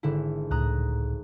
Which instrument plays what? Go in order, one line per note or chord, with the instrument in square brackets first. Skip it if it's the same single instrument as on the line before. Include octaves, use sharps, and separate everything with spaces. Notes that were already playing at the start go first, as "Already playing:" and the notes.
[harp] G#1 D3 E4
[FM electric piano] C#2 A2 [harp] A#5 D#6 F#6